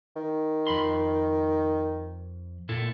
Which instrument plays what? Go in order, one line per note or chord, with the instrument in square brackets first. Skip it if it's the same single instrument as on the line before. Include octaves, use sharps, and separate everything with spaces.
[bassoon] D#3
[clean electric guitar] F2 B5 C6
A#2 E4 A4